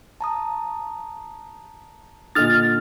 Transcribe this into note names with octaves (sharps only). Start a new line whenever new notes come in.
A5 A#5 D#6
A#2 D3 D#5 D#6 F6 A6